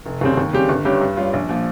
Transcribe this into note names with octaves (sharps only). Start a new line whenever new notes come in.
F1
D#2 C#3 G3 C4
D#2
C#3 G3 C4 G4
G1
G2 G3 C#4 G4
G2
G3 C#4 F4
A#1
A#2 F3